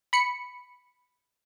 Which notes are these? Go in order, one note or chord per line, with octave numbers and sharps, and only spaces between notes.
B5 C#7